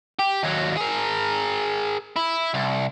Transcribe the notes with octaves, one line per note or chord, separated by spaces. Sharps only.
G4
D#2 F#3
G#4 A#4
E4
C2